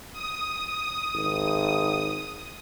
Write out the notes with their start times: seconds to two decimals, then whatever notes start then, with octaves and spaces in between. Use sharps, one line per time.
0.13 D#6
1.15 G#1